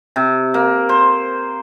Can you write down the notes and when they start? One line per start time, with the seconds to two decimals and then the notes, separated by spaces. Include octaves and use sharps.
0.16 C3
0.54 A#3
0.89 C5